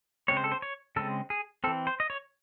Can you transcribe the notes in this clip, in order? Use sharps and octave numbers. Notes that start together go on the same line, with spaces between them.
C#3 G#3 C4 C#5
C5
A4
C5
C#5
C#3 G#3 C4 A4
G#4
E3 C4 A4
C5
D#5
C#5